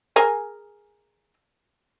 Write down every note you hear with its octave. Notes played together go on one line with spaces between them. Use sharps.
G#4 A#4 G#5